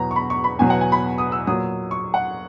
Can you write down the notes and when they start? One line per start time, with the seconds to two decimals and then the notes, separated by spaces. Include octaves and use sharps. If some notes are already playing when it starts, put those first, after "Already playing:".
Already playing: E2 B2 F#3 A#5
0.11 C#6
0.16 B5
0.30 C#6
0.44 B5
0.59 E2 B2 F#3 G#5
0.70 F#5
0.81 G#5
0.92 B5
1.18 D#6
1.32 E6
1.47 A#2 F#3 D#6
1.91 C#6
2.14 F#5